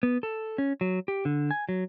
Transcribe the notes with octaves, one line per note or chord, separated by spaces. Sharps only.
B3
A4
C#4
F#3
G4
D3
G#5
F#3